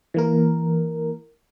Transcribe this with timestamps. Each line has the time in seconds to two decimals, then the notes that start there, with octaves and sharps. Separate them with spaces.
0.14 E3 A#3 A#4